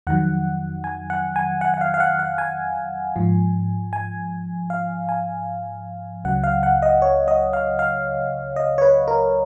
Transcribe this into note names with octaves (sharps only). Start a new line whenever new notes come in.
F2 D#3 F#3 F#5
G#5
F#5
G#5
F#5
F#5
F5
F5
F#5
F#5
G#5
G#2 F3
G#5
F5
G#5
C#2 C#3 F#3 F#5
F5
F#5
D#5
C#5
D#5
F5
F5
D#5
C#5
B4
A#4